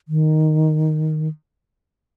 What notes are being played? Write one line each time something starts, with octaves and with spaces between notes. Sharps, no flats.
D#3